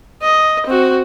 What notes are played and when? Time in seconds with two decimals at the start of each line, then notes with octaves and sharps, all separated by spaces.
0.22 D#5
0.66 C4 F#4